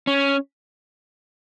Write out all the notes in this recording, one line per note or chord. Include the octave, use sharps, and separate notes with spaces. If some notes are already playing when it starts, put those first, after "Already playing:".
C#4